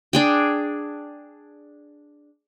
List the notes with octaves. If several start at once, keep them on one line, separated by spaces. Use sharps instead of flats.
D4 G#4 G5